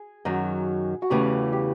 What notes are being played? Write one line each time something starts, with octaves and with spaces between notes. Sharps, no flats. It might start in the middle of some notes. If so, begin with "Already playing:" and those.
Already playing: G#4
F#2 D#3 F#3
F#4
E2 C#3 E3 A3 G4
G4